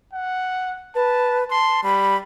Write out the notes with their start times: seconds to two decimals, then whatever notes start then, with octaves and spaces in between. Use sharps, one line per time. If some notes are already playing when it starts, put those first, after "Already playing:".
0.13 F#5
0.95 B4 A5
1.50 A5 C6
1.83 G3 B5